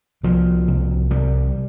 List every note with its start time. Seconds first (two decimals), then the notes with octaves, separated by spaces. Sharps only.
0.23 C2 F3
0.68 C2
1.10 C2 G3